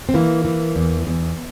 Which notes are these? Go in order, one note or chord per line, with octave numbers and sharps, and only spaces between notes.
C4
E3 A#3
E3
E2
E2